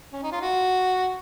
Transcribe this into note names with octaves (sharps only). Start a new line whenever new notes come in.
C#4
D#4
F4
F#4